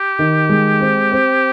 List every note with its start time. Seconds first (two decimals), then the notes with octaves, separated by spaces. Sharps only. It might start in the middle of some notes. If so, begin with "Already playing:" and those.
Already playing: G4
0.19 D#3
0.49 G#3
0.80 C4
1.12 C4